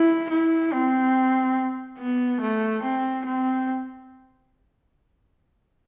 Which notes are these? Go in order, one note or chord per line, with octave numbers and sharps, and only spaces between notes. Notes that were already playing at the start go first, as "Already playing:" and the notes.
Already playing: E4
E4
C4
B3
A3
C4
C4